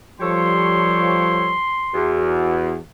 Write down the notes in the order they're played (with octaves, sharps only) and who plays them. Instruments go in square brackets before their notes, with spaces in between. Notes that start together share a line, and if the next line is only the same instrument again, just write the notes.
[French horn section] F3 G3 [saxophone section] G4 A4 C#5 [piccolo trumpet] C6
[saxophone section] E2 [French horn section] F#4